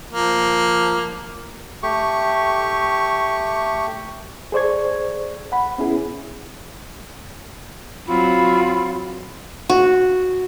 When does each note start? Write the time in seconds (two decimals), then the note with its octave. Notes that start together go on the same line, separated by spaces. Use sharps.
0.10 F3 A#3
1.83 A3 G4 C#6
4.52 G#4 A4 C5 D5 C#6 G#6
5.52 F#5 B5
5.78 B3 C#4 E4 G#4
8.07 F#3 C4 F4 B5
9.69 F#4